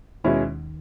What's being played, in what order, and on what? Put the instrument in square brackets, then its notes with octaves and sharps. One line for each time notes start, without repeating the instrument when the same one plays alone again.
[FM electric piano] D#2 D#3 [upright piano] B2 G#3 C#4 E4